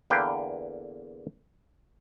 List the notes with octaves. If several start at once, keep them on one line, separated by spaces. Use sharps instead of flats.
E2 D3 A#3 B4 F5 G5